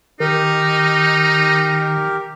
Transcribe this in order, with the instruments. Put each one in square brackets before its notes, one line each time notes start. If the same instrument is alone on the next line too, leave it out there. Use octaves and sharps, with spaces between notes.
[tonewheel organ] D#3 [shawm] D#4 [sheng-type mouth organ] G4 A#4